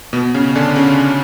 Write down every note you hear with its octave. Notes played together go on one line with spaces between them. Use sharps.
B2 B3
C#3 C#4
D3 D4
C#3 C#4